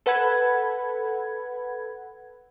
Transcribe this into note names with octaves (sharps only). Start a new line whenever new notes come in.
A4 B4 F#5 B5 G#6